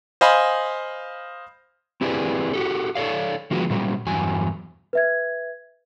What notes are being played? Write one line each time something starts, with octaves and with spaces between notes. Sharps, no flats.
C5 D#5 F5 G#5 B5
C4 E4 G4 G#4 B4 D5
F#4 G4 A4
A4 C#5 D5 F5
D#3 F3 G#3 B3 F#4
A#2 F#3 G3
E2 G2 F#3 G#5
B4 E5 G#6